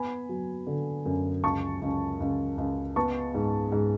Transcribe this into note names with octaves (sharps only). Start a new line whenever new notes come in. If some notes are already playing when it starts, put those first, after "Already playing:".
Already playing: B3 G#5 B5
F#3
D3
F#2
C#2 A5 C#6
C#2
C#2
C#2
B3 A5 C#6
G#2
G#2